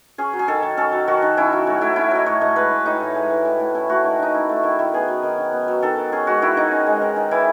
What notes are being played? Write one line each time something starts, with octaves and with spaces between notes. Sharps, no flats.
C#4 G#4
F#3
G#4
D#3 A4
D#3
C#4 A4
F#3
D#3 F#4
D#3
C#4 E4
F#3
A2 F#4
A2 E4
C#4 E4
F#3 D#5
A2 C#5
A2 D#5
G#3 B4
E3
A2 D#4
A2
G#3
E3
A2
A2
C#4 E4
A3 F#4
D#3
D#3 D#4
C#4 E4
A3
D#3 E4
D#3 E4
B3 G#4
F#3
D#3
D#3
B3
F#3
D#3 A4
D#3
C#4 G#4
G#3 F#4
D#3 E4
D#3 D#4
C#4
G#3
D#3
D#3
E3 E4